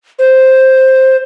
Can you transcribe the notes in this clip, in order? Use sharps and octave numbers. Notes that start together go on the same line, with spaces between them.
C5